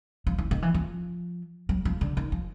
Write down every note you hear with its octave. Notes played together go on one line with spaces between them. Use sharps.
F3
E3
D#3
E3
F3
F#3
F3
D3
D#3
F3